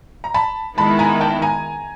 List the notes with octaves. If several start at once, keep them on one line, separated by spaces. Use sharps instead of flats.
A#5
A5 B5
D#3 G#3 B3 E4 A5 B5
G#5 A#5
G5 A5
G#5 A#5